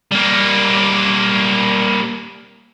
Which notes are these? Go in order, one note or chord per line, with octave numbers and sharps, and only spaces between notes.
G3 A#3